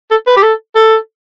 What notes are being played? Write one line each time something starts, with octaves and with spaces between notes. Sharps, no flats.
A4
B4
G4
A4
A4